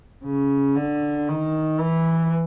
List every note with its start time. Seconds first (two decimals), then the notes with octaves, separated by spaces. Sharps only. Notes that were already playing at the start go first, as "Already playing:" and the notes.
0.24 C#3
0.76 D3
1.28 D#3
1.80 E3